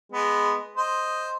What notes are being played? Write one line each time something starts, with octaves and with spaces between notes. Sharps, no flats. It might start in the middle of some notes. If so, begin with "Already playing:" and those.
G#3 B3
C5 D#5